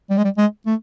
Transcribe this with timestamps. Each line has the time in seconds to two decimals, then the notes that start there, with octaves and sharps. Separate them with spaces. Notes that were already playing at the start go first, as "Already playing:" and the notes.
0.10 G3
0.17 G#3
0.24 G3
0.38 G#3
0.66 A3